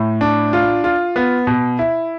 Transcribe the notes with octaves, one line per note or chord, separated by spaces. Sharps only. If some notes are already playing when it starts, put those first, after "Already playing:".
Already playing: A2
D4
F4
F4
B3
B2
E4